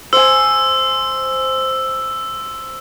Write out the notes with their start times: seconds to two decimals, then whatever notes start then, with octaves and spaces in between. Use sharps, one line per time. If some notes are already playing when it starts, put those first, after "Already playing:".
0.13 C5 G#5 E6